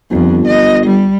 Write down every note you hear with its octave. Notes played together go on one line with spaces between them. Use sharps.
G1 F2
D#5
G3